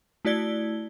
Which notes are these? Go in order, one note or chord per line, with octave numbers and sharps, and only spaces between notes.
A3 E4 F#4 D5 G#6 G7